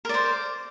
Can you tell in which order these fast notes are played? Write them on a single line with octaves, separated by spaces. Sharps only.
A#4 D5 C5